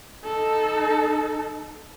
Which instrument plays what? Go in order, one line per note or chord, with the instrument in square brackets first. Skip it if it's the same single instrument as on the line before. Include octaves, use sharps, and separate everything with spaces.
[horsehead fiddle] D#4 A4